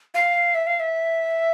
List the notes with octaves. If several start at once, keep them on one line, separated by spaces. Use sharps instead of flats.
F5
E5
F5
E5